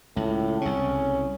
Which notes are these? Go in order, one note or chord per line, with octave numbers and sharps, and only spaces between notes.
C#2 A2
C2 C#3 C#4